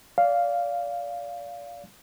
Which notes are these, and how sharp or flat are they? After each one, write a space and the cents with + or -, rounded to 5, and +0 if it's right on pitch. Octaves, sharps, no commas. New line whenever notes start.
D5 -30 F5 +0